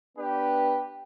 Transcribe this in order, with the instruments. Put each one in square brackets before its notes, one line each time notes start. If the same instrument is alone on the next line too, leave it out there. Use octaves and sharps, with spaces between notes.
[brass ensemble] B3 D4 G4 B4